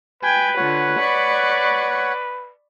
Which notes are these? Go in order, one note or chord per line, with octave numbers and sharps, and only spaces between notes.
B4 G5 G#5 G#6
D3 F4 C#5 F#5
D5 B5 C#6